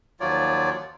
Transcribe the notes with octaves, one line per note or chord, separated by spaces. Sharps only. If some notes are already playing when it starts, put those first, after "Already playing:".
D#2 F3 F#3 F4 C#5 D5